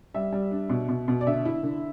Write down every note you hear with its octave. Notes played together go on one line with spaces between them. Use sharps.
G3 E5
G3
D4
B2
B2
B2
D5
D3 E5
E4
D3